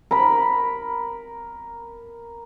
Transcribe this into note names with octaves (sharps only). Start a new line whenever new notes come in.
A#4 B5